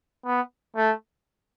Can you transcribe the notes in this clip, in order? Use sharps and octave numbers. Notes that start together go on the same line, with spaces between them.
B3
A3